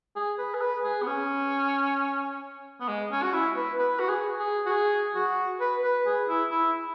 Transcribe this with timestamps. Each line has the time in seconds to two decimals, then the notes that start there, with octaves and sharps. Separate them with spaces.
0.16 G#4
0.39 B4
0.54 G#4
0.61 B4
0.84 G#4
1.02 B3
1.07 C#4
2.80 B3
2.88 G#3
3.11 C#4
3.23 F#4
3.33 E4
3.57 B4
3.79 B4
3.99 F#4
4.09 G#4
4.39 G#4
4.66 F#4
4.69 G#4
5.15 F#4
5.60 B4
5.83 B4
6.06 G#4
6.28 E4
6.51 E4